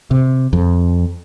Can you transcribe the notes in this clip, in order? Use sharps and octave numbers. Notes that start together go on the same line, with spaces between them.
C3
F2